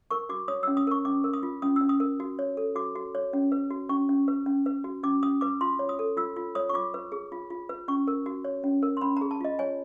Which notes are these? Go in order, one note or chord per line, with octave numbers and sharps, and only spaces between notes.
A#4 C#6
F#4 D6
C#5 D#6
C#4 E6
D#6
A#4 C#6
C#4 D6
A#4
D#6
F4
C#4 D#6
C#4 E6
D#6
A#4
F#4
C#5
A4
F#4 D6
F#4
C#5
C#4
B4
F#4
C#4 C#6
C#4
B4
C#4
B4
F#4
C#4 D6
C#4 D#6
B4 D6
F4 C6
C#5
D#6
A4
F4 E6
F4
C#5 D#6
C#6
F4 D6
B4
G#4
F4
F4
B4
C#4 C#6
A#4
F#4
C#5
C#4
A#4
C6
C#4 B5
G#4 A#5
A5
F4 D#5
C#5 G#5